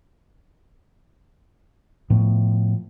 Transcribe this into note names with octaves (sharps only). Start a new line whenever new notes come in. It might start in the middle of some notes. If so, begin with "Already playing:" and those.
A2 F3 B3